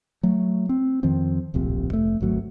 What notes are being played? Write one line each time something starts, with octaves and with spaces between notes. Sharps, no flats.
F#3 A3
C4
F2 D#3 F3 C4
D1 A#1 C3
F1 A3
G#1 D2 F#3 A3